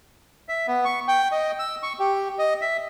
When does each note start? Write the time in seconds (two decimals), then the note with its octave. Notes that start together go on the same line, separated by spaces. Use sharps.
0.49 E5
0.68 B3
0.85 C#6
1.08 G5
1.32 D#5
1.59 E6
1.83 C#6
1.99 G4
2.39 D#5
2.61 E5